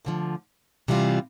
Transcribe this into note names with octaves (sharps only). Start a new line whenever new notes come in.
D2 D3 F3
C3 E3 G3 C4 F4